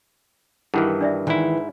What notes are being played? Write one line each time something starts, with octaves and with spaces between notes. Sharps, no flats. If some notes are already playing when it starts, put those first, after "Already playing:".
G2 D#3 E3 E4 G#4 F#5
D4 D5 E5
G#2 D#3 E3 E4